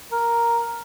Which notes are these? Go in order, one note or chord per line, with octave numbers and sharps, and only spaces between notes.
A#4